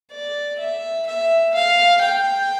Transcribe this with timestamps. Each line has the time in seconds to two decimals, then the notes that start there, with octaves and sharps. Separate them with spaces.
0.12 D5
0.60 E5
1.07 E5
1.55 F5
2.02 G5